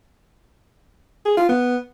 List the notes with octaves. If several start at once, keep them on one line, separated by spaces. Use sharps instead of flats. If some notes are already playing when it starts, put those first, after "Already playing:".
G#4
F4
B3